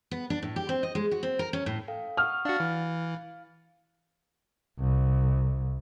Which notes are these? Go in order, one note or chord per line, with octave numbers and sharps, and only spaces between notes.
B3
D4
A2
G4
C4
D#5
G#3
F#4
C4
A#4
C#4
A2
A4 F5 G5
F#5 C#6 D#6 F6
D4 F#4 F5 A6 C#7
E3
C2